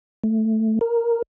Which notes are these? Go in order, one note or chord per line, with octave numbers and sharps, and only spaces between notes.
A3
A#4